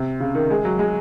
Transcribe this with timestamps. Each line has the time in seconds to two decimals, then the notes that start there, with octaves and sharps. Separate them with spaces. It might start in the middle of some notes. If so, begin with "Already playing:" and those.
Already playing: C3
0.20 C#3
0.35 D#3
0.50 G#3
0.65 F#3
0.79 G#3